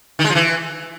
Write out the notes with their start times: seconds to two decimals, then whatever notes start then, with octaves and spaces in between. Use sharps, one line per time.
0.19 D#3
0.24 G#3
0.30 F3
0.35 E3